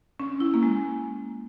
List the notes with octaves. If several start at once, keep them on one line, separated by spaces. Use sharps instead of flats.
C#4
E4
A#3
G#3